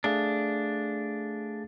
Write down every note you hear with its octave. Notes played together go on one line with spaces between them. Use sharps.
A3 D4 G#4 F5